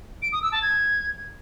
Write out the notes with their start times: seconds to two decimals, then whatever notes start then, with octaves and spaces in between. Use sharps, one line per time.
0.22 D7
0.32 D#6
0.42 E6
0.52 A5
0.62 G#6